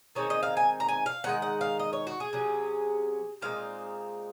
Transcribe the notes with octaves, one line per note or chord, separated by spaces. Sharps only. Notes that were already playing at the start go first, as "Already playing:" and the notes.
D#3 G#3 C4 D#4 C#5
D#5
F5
G#5
A#5
G#5
F5
D#3 G#3 D#4 F#5
F#5
F5
D#5
C#5
F#4
G#4
C3 F#3 C#4
A#2 G#3 C4 D#4 F5